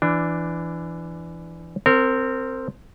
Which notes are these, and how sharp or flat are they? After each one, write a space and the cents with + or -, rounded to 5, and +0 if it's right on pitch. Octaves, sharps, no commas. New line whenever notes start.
E3 +20 D4 +5
C4 +0 A#4 -25